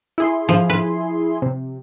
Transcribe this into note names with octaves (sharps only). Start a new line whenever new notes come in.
E4 G#4 C6
F3
B4
C3